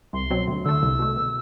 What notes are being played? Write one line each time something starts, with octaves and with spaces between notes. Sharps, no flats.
C2 C6
B2 F#3 C4
D2
D3 A3 E6
C2
B2 A3
B2